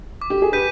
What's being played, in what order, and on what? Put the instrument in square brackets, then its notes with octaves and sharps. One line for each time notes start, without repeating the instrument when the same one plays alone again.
[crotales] D6
[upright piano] G4
G#4
[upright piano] G4 B4 [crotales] G6 B6 D#7